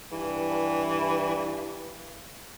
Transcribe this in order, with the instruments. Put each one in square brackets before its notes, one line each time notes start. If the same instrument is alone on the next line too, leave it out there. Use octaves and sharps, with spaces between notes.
[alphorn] G2 [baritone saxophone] E3